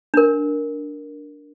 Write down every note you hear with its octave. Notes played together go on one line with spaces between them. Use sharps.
D4 A#4